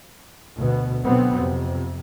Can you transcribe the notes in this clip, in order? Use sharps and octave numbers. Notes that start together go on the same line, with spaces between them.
D2 B2 B3
B2 D3 F#3 B3 C4
F2 C3